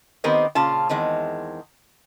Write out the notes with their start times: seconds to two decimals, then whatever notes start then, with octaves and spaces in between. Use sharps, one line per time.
0.24 D#3 B3 C4 G4 A#4 D#5
0.55 A#2 C#3 F4 A5
0.89 E2 D#3 G#3 C4